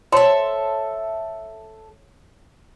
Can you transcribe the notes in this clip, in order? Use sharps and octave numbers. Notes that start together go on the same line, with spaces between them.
A4 C5 C#5 E5 C6